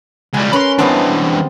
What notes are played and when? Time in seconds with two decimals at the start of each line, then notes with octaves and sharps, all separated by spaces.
0.34 C#2 G3 G#5
0.53 C#4 A#4 B4 B5 C6
0.79 E3 G3 B3 C4 D4